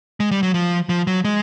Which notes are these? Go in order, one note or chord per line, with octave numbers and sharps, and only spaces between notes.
G#3
G3
F#3
F3
F3
F#3
G#3